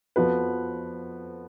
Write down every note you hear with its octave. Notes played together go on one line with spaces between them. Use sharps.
F2 F3 B3 F#4 B4